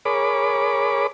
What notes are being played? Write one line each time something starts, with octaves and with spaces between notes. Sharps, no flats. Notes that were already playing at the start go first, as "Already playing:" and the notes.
G#4 A#4 C#5 B5 D6